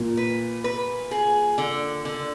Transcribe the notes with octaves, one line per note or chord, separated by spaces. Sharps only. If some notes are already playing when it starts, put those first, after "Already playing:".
Already playing: A#2
B4
B4
G#4
D3
D3